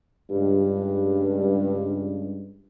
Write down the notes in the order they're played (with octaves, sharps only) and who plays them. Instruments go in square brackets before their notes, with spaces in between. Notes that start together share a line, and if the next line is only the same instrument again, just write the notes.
[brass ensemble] C#2 G2